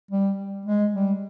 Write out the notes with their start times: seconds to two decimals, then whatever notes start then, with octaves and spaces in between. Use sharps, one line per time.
0.11 G3
0.66 G#3
0.94 G3